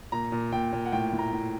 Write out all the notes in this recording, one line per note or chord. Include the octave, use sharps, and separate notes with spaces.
A#2 A#5
A#2
A#2 G5
A#2
F#5
A2 G5
A2
A#5
A2